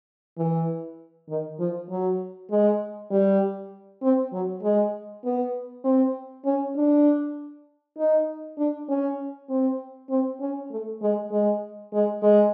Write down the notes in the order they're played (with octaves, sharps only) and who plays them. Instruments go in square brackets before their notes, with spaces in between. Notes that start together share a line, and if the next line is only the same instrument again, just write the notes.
[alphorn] E3
D#3
F3
F#3
G#3
G3
C4
F#3
G#3
B3
C4
C#4
D4
D#4
D4
C#4
C4
C4
C#4
A3
G#3
G#3
G#3
G#3